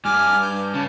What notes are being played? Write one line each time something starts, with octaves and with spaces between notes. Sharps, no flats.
G2 G#5 D6 F6
G6
C#3 A5